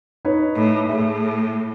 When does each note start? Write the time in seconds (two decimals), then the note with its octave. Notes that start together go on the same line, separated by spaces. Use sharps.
0.25 D#4 B4 C#5
0.55 A2
0.89 A2 G#4 E5